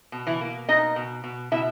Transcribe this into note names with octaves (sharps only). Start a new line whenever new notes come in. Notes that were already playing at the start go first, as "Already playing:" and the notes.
B2
E3 E4
A#3
B2 D#4 D#5
B2
B2
B2 E4 E5